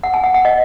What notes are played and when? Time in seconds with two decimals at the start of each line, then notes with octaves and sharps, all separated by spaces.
0.03 F#5
0.14 G#5
0.24 F#5
0.34 F#5
0.45 D#5